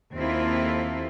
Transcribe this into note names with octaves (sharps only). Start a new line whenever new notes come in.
D#2 A#3 C4 E4 F4 A4